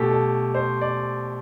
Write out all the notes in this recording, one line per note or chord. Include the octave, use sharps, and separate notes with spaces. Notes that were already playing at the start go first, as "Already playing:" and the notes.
Already playing: B2 A3 G4 A4
A4
C5
D5